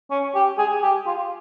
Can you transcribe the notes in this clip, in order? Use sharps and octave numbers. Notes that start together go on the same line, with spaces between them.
C#4
G4
G#4
G4
F4